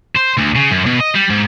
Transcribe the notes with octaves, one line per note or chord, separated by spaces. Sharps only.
C5
D2
C#3
F#2
B2
D#5
G3
G#2